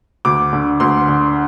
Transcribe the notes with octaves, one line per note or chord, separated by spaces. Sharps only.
D2 D6
D3
D2 C6
D3